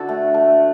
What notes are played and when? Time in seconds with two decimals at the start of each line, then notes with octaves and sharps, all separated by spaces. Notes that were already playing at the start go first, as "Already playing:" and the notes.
Already playing: D3 F#4 A4
0.09 A3
0.34 A3